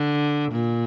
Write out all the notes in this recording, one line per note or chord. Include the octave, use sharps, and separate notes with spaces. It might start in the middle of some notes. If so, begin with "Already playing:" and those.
Already playing: D3
A#2